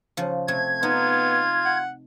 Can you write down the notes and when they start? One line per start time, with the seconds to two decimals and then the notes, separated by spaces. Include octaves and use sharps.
0.17 C#3 F3
0.48 C3 A3 G#6
0.83 B3 D#4 F4
1.65 F#5